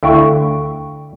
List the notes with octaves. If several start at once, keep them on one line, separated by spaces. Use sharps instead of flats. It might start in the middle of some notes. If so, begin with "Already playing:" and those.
D2 D3 E4 F5 G5 C#6